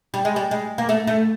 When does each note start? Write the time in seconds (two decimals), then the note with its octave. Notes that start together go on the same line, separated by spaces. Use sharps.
0.14 G3
0.25 G#3
0.36 G3
0.51 G#3
0.78 A#3
0.89 A3
1.07 A3